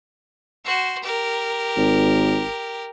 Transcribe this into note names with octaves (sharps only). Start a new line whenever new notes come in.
F#4 C5
G4 A#4
G#1